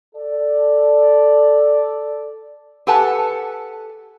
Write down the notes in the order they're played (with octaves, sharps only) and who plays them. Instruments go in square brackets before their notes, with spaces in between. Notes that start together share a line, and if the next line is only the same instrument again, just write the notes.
[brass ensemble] A4 D5
[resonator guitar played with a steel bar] G4 A4 B4 F#5 G#5 A5